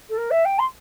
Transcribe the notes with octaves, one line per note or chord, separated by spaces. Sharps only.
A4
A#4
E5
G5
C6